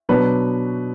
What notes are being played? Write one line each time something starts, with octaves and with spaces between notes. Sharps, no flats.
B2 F#3 B3 D4 B4